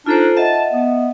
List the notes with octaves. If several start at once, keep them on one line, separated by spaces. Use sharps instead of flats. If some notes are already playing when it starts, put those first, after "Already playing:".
D4 D#4 F4 A4 C5
D#5 E5 F#5 A5
B3